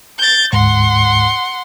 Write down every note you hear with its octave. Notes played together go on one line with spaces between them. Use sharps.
G6 A6
D2 G#2 F#5 C6